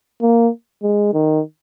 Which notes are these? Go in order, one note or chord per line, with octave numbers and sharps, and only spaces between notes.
A#3
G#3
D#3